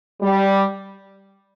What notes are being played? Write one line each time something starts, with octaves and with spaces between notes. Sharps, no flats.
G3